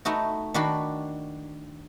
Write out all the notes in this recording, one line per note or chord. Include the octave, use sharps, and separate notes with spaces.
A3 B3 D#4 F#4
D#3 D4 F#4 B5 C6